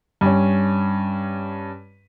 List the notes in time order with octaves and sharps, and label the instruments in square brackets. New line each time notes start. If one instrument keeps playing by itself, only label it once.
[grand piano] G2 C#4